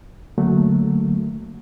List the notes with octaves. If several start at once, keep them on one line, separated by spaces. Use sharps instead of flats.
D3 F#3 A3 A#3